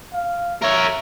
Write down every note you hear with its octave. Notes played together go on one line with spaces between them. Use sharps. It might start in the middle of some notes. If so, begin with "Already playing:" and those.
F5
A#4 C#5 E5